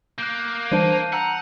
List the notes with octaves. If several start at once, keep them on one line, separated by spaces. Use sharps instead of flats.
A#3 F#6 G6
E3 G3 D4 C5 A5 G6 D#7
F#5 A#5 E6